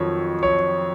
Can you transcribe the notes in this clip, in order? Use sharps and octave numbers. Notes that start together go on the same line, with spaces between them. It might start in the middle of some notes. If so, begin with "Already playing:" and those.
Already playing: F2 D#3 F#3 C#5
C#5